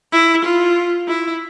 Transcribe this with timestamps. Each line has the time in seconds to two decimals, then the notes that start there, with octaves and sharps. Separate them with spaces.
0.13 E4
0.44 F4
1.08 E4